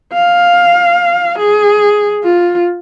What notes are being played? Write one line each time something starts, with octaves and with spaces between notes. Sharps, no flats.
F5
G#4
F4